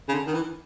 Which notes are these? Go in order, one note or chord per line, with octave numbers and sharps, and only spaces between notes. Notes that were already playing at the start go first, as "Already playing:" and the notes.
C#3
D3
D#3
E3